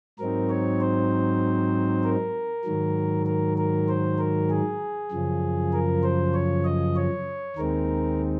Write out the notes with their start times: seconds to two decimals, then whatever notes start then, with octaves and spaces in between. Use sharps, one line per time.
0.19 G#2 F#3 C4 D#4 A#4
0.50 C#5
0.81 C5
2.04 A#4
2.65 G#2 D#3 F#3
3.26 A#4
3.58 A#4
3.88 C5
4.18 A#4
4.50 G#4
5.12 F#2 C#3 F3
5.73 A#4
6.03 C5
6.34 C#5
6.64 D#5
6.96 C#5
7.56 D#2 D#3 G#3 C4 D#4 A#4